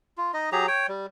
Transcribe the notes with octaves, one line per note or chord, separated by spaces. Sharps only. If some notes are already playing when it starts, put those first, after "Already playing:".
F4
D#4 D#5
F#3 G4 G#4 A#5
C#5 G5
G3